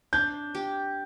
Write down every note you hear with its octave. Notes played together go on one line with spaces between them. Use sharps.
D4 G6
G4